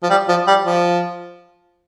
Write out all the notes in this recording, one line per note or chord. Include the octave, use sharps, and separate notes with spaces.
F3
G3
F3
G3
F3